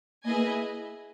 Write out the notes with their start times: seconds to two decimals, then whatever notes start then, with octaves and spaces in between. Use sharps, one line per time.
0.25 A#3 E4 G#4 B4 D#5 G#5
0.36 A#3